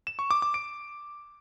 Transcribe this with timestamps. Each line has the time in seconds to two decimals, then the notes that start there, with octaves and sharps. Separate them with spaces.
0.07 E7
0.19 C#6
0.31 D6
0.42 D6
0.54 D7